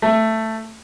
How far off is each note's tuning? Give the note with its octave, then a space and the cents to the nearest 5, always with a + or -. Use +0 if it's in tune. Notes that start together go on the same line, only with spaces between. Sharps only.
A3 +10